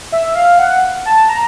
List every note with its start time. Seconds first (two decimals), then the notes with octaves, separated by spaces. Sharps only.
0.12 E5
0.35 F5
0.59 F#5
1.05 A5
1.29 A#5